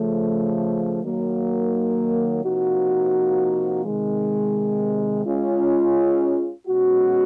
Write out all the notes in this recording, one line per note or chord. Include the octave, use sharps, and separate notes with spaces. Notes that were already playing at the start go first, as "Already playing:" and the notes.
Already playing: C#3 F3 A3
D#3 F#3 A#3
C3 F3 A#3 D#4 F#4
C3 D#3 G#3
G#3 C#4 F4
B2 G#3 C#4 F#4